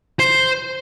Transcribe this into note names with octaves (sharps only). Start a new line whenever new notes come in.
C5